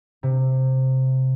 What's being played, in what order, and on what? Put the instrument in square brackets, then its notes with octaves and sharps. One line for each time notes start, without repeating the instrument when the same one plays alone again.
[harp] C3